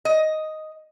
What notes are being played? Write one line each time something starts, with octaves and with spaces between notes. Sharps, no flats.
D#5